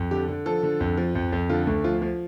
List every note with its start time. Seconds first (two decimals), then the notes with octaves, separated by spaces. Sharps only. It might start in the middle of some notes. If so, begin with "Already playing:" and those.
Already playing: F2
0.11 D3 G4
0.29 D3
0.46 F3 A4
0.63 D3
0.80 F2
0.97 F3
1.15 F2
1.32 F2
1.49 D3 F4
1.67 D2
1.84 F3 F4
2.02 F3